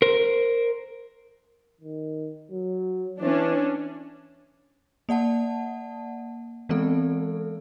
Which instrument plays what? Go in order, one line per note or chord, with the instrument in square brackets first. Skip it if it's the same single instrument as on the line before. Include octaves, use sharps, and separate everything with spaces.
[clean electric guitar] A#4 C5
[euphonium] D#3
F#3
[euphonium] E3 [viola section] C#4 D4
[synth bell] A#3 D5 F#5 A5
E3 G#3 B3 C4 A4